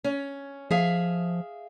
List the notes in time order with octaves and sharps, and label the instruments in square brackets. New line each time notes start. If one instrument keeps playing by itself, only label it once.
[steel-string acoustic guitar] C#4
[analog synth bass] F3 [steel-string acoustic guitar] G#4 E5 F5